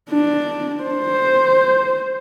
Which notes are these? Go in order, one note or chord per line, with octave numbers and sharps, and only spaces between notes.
D4
C5